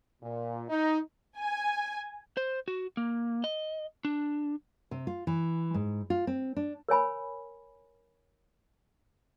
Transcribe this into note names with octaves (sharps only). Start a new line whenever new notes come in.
A#2
D#4
G#5
C5
F#4
A#3
D#5
D4
C3
F4
E3
G#2
F4
C4
D4
A#4 C#5 G#5 B5